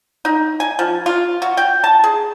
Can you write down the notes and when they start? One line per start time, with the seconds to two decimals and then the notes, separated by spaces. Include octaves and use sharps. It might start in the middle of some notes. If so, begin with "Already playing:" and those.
0.25 D#4
0.60 G#5
0.79 F3
1.06 F4
1.42 F#4
1.57 G5
1.84 A5
2.04 G#4